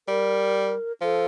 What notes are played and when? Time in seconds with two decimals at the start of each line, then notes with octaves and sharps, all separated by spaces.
0.08 G3 A#4
1.01 F3 A4